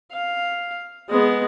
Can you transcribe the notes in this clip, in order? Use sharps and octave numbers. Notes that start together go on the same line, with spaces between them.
F5
G#3 B3